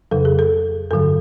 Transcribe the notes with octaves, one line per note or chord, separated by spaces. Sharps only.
F2 C#3 F#3 A4
G#4
A4
G2 D3 F#3 A4